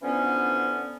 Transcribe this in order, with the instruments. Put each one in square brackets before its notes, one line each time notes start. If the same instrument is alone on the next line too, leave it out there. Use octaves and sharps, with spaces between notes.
[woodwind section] D3 E3 F3 B3 C#4